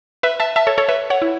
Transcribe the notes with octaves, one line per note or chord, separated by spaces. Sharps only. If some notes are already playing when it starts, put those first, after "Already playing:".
B4 E5
E5 A5
E5 A5
A4 C#5
A4 C#5
B4 E5
C#5 F#5
E4